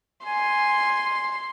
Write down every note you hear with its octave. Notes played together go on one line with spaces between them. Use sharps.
G#5 C6